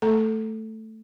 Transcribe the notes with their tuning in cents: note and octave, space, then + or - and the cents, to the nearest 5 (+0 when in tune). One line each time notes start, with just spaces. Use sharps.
A3 +0 A4 +0 A#5 +0